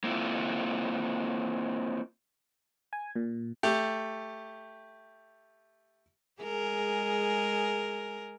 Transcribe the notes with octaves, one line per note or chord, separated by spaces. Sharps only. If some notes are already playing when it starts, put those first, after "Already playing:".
A#3 C4 E4 F4
G#5
A#2
A3 G4
G#3 G#4 A#4